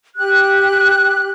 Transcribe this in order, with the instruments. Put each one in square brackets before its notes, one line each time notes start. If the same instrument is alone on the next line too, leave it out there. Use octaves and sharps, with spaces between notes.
[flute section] G4 F#6